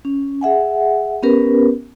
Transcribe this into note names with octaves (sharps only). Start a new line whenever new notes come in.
C#4
G#4 E5 F#5 G#5
B3 C#4 G4 A#4 B4